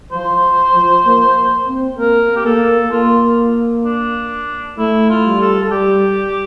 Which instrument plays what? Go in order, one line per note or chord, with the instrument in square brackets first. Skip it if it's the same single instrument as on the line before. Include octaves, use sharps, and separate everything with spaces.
[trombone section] F3 [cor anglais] C5
[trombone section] F3
A#3
C4
[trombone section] A#3 [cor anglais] A#4
[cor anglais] G4
[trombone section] A#3 [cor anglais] A4
[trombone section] A#3 [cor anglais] F4
[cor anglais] D4
[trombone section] A3 [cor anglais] E4
[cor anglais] F4
[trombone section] G3
[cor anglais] A4
A4
[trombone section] G3 [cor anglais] G4